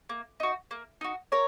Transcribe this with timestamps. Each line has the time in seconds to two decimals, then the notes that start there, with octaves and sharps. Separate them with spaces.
0.09 A#3
0.40 D#4 F#4
0.71 A#3
1.01 D#4 F#4
1.32 A#4 C#5